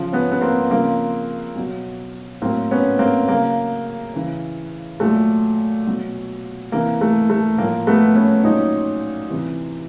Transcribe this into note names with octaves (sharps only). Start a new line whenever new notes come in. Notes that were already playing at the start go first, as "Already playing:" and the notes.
Already playing: C#3 F3
B3 C#4
B3
A#3 C4
C#3 F3 A#3 C4
B2 F#3
A2 F#3 A#3 C4
B3 C#4
A#3 C4
C#3 F#3 A#3
C#3 E3
A#2 F#3 A3
B2 F#3
C3 E3 A#3
A3
A3
A2 F3 A#3
A3 B3
B3 C#4
A#2 F#3 C#4 D#4
C3 E3